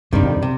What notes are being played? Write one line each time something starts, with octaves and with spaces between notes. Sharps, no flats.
G2 C3 D#3 G3
F2
C3